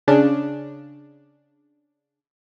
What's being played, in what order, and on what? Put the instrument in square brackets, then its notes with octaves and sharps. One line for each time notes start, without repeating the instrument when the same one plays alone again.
[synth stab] C#3 D4